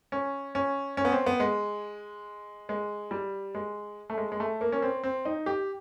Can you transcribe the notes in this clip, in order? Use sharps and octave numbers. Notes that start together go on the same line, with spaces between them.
C#4
C#4
C#4
B3
C4
B3
G#3
G#3
G3
G#3
A3
G#3
G#3
A3
A#3
C#4
C4
C4
D#4
G4